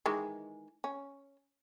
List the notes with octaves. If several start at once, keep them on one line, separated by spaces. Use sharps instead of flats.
D#3 E3 G#3
C#4